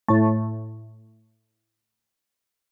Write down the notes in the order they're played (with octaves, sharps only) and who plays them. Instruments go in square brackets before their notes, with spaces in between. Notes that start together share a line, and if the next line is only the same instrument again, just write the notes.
[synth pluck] A2 A3